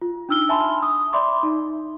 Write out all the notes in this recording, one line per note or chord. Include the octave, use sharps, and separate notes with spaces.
F4
D4 D#4 E6 F6 G7
E5 G#5 A5 B5 C6
D#6
D5 E5 B5 C6 D6
D#4